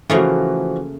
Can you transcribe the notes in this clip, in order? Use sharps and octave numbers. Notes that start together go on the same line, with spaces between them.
C#3 E3 F3 A3 A#3 F#4